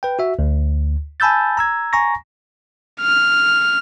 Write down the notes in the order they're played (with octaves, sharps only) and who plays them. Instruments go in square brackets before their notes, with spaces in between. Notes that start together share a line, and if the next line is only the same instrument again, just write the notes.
[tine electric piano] B4 G5
F#4 E5
D2
G#5 A5 B5 E6 G6 A6
A#5 E6 G#6
G#5 A#5 C#6 A#6
[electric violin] F6